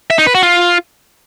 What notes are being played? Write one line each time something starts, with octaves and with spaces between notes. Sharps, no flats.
E5
D#4
B4
F#4
F4